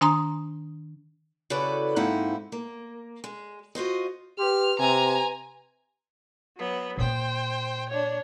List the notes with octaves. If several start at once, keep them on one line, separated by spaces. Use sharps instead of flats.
D#3 D4 G#5 A#5 C6 D#6
C#3 E4 F#4 A4 B4 D5
G#2 A#3 C4 D#4 E4 F#5
A#3
G#3
F4 F#4 C5 D#5
G4 B4 C6 F6
C3 G#5 A#5
F#3 B3
A#2 A#3 C5 G5
D4 C#5